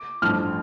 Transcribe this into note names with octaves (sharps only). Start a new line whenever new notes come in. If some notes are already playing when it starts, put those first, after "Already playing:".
Already playing: D6
A1 G2 F3 A3 F6